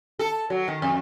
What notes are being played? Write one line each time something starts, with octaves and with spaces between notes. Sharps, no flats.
A4
F#3
D#3
F2